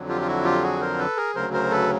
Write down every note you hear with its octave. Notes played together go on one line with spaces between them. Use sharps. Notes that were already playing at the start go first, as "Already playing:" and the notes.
Already playing: F2 D3 F#3
F4 G4
F4
E4 F#4
F4 G4
F#4 G#4
A#4 C5
A4 B4
G#4 A#4
D2 C#3 F#3 A#4 C5
A#4 C5
A4 B4